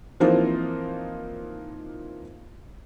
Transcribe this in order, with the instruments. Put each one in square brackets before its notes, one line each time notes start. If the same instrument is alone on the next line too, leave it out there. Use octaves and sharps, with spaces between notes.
[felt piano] E3 F3 A#3 C4 D#4 F4